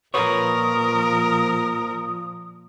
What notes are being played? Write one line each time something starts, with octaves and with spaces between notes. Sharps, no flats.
A#2 F3 A#4 B4 C#5 D#6